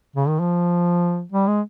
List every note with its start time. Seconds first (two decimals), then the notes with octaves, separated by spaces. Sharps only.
0.16 C#3
0.28 D#3
0.40 F3
1.32 G3
1.47 G#3